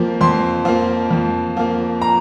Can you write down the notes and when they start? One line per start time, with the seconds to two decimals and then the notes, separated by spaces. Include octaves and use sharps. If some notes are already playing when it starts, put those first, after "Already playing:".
Already playing: F2 F3 A#3
0.21 F2 C6
0.65 F3 A#3
1.11 F2
1.57 F3 A#3
2.02 A#5